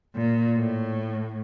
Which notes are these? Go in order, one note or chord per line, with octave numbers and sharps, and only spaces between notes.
A#2
A2